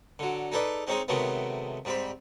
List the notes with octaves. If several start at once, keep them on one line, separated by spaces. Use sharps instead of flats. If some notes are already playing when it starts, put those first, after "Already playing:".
D3 F#3
D#4 G#4 A4 B4 D5
G#3 C4 C#4 D#4 G#4
C3 D#3 F#3 G#3 A3 B3
G#2 G3 C4 B5